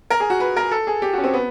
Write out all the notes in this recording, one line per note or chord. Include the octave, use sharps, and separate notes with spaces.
A#4
G#4
F#4
B4
A#4
A4
G#4
G4
F#4
C#4
C4
B3